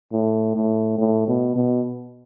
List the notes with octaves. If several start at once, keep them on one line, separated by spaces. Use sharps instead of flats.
A2
A2
A2
B2
B2